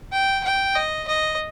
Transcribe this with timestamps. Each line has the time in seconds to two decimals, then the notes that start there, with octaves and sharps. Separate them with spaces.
0.12 G5
0.44 G5
0.75 D#5
1.08 D#5